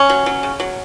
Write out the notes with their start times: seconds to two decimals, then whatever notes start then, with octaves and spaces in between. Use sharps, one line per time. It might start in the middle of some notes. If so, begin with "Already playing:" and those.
Already playing: C#4
0.10 F#3
0.26 F#3
0.43 C#3
0.60 F#3